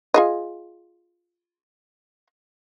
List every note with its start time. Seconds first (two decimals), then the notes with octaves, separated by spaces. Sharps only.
0.14 F4 G#4 D#5